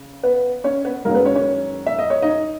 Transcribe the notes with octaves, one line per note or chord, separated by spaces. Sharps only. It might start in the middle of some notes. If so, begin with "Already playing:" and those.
Already playing: C#3
B3 B4
C#4 C#5
B3 B4
F#1 F#2 D#3 G#3 A#3 C#4 A#4
B3 B4
C#4 C#5
C#4 C#5
E5
D#5
C#5
D#4 D#5